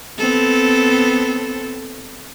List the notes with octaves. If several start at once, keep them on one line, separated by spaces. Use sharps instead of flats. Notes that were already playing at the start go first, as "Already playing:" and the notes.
B3 C4 A4